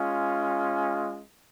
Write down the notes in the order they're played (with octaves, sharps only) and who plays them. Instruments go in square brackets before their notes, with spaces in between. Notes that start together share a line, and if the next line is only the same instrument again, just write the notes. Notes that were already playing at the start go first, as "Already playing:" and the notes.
Already playing: [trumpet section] G#3 C#4 F4